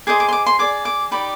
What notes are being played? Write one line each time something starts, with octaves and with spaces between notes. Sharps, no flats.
G#4 C5 D#5 D6
D6
C6
D6
C6
G#4 D5 D6
D6
D#4 G4 D5 B5